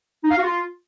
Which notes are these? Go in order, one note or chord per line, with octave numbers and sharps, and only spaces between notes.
D#4
F5
F#4
F4